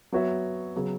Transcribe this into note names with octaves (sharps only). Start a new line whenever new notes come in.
F#3 B3 F#4 C#5 E5
C#3 F#3 B3